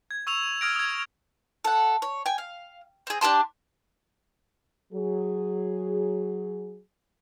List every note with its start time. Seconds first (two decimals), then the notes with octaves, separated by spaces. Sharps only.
0.11 G#6
0.27 C#6 E6 E7 F7
0.61 D#6 F6 G#6 A#6 D7
0.76 D#6 G#6
1.65 A4 F#5
2.02 C#5
2.26 G5 G#5
2.38 F5
3.07 C4 G#4
3.21 D4 G4 A5 C6
4.93 F#3 G#4